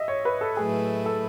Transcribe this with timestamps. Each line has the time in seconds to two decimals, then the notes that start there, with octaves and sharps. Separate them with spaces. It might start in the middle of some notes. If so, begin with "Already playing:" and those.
Already playing: D#5 E5
0.08 C#5
0.25 B4
0.41 A4
0.57 A2 F#3 A3 E4 G#4 B4
1.06 A4